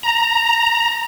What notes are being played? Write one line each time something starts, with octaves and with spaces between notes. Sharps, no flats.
A#5